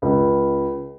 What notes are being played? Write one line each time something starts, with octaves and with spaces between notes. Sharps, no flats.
C#2